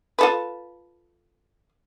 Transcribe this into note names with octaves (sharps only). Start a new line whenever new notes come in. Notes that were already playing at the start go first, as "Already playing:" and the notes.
F4 A4 B4